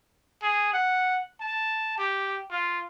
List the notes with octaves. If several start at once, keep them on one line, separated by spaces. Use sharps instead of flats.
G#4
F#5
A5
G4
F4